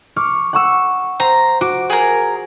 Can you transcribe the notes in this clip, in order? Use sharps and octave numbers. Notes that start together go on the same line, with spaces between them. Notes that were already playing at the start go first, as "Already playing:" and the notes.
C#6 D6 F6
F#5 C#6 E6
C5 A#5
F#4 D6
G#4 A#4